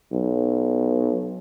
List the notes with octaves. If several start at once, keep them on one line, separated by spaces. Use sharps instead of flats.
B1